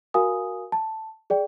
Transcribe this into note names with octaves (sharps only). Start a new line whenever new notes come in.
F#4 A#4 F5 G#5 D#6
A5
G#4 D5 G5